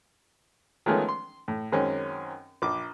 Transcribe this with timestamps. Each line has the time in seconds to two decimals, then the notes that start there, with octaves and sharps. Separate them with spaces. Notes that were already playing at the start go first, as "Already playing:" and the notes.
0.86 D#3 F3 G#3 A3 B3 C#4
1.09 C6
1.48 A2
1.72 F#2 D#3 G#3 C4 C#4
2.62 A#1 D6